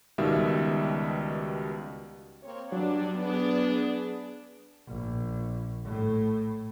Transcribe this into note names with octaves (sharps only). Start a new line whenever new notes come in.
C#2 B2 D#3 G3 E5
A#3 C4 C#5
G2 F#3 D4
B3 D4 G#4
A#1
A2